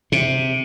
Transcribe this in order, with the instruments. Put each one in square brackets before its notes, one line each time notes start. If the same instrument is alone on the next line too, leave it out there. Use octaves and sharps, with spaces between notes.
[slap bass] C3